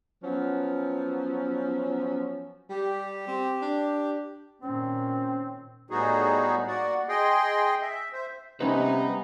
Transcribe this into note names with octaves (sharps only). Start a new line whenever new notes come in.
F3 F#3 B3 C#4
G3 G4
C4
D4
A#2 D#3 C4 C#4
A2 G3 B3 D#4 F#4 G#4
A#3 F#4 D5 F#5
G#4 D#5 G5 C6
E5
C5 E5
C3 G3 B3 C#4 D#4 B4